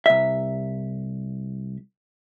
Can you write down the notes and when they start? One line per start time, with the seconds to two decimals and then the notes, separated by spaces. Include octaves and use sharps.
0.06 C2 E5